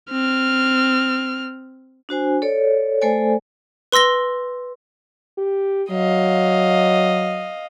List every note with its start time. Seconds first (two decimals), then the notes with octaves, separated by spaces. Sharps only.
0.11 C4 F6
2.09 D4 F#4 C5 G#5
2.42 A4 C#5 D5
3.02 A3 A4 C5 D5 G#5
3.92 B4 C6 E6 A#6 G7
5.38 G4
5.90 F#3 D#5 F5